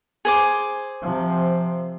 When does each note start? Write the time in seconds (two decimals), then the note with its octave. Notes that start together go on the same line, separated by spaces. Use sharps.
0.25 G#4 C5 D6
1.02 C3 F3